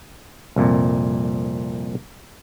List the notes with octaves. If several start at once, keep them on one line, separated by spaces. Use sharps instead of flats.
C2 F2 A#2